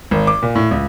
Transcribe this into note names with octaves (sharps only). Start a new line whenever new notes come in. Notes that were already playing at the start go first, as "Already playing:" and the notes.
G#1
D6
A#2
A2
C#2